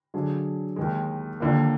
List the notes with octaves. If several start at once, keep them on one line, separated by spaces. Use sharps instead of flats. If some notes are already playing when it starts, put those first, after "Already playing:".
D3 F#3 D4 G#4
D#2 D#3 G#3
D#2 D3 F3 A#3